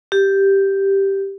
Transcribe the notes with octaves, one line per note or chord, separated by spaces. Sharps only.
G4